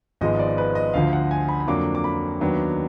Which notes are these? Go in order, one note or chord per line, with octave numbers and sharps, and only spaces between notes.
G#1 G#2 F3 G#3 B3 D#5
D5
B4
D#5
D2 D3 F3 F5
F#5
G#5
B5
B5
F2 D3 F#3 A#3 D4 D6
D6
B5
D#2 D#3 F#3 B3 D4